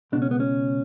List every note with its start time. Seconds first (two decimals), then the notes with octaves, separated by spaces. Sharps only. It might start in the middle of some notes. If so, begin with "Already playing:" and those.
0.12 C#2 B2 D4
0.22 C#4
0.31 B3
0.40 C#4